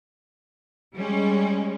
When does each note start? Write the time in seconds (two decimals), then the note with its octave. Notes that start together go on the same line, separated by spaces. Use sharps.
0.96 G3 G#3 C#4